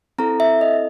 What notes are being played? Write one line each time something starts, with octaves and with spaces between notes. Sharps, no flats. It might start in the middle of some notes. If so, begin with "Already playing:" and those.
C4 E4 A4 A#5
E5
D#5